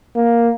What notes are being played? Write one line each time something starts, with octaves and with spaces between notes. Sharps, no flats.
A#3